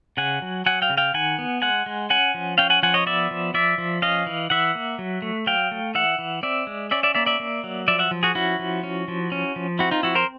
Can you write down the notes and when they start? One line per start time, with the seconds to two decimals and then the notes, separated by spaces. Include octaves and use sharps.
0.17 C#3 F#5 G#5
0.42 F#3
0.66 F#3 F#5 G#5
0.82 F5 G5
0.90 C#3
0.97 F5 G5
1.14 D#3 F#5 G#5
1.39 B3
1.62 G#3 F#5 G#5
1.86 G#3
2.10 C#4 F#5 G#5
2.34 F3
2.58 C#4 F5 G5
2.70 F#5 G#5
2.83 F3 F#5 G#5
2.94 C#5 D#5
3.06 B3 D5 E5
3.31 F3
3.54 F3 D5 E5
3.78 F3
4.02 C#4 D#5 F5
4.26 E3
4.50 E3 E5 F#5
4.75 A#3
4.99 F#3
5.22 A3
5.46 F#3 F5 G5
5.71 A3
5.95 E3 E5 F#5
6.19 E3
6.43 C4 D5 E5
6.67 G#3
6.91 C#4 D5 E5
7.03 D5 E5
7.15 A#3 D5 E5
7.26 D5 E5
7.40 A#3
7.64 F#3
7.88 F3 D5 E5
7.99 E5 F#5
8.11 F3
8.23 F#4 G#4
8.35 C#4 E4 F#4
8.59 F3
8.83 C#4
9.08 F3
9.32 C#4
9.56 F3
9.79 C4 E4 F#4
9.91 D#4 F4
10.03 F3 E4 F#4
10.15 A#4 C5